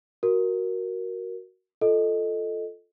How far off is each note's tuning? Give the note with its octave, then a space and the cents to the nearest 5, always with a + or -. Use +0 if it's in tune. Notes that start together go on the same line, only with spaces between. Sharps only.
F#4 +5 A#4 +5
F4 +0 A4 +0 D#5 +0